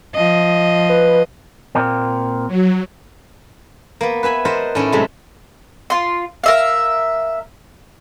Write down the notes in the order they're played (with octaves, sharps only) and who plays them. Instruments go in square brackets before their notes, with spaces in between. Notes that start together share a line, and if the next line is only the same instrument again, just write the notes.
[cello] F3 D#5
[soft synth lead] B4
[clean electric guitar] A#2 A#3 C4
[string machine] F#3
[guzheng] A#3 B3
B4 E5 G#5 B5
A#4 C5 D#5 F#5 A5 B5
A2 C#4 D#4 E4
C3 F#3 G#3 A3
[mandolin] F4 C6
A#4 E5 F5